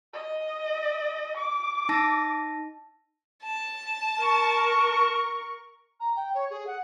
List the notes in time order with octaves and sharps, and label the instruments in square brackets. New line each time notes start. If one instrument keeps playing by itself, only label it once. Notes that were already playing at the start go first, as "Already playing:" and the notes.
[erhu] D#5
D6
[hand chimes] D#4 A5 A#6
[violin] A5
[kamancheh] A#4 C#6
[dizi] A#5
G5
C#5
G#4
F#5